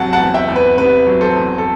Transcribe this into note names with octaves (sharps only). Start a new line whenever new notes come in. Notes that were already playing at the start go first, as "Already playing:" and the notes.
Already playing: E2 C3 F#3 F#5 A5
F#5 A5
E2
E5 G5
E2
B4
C3 B4
F#3
A4 C5
E2
A4